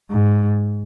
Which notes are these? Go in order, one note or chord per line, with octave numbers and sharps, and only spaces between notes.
G#2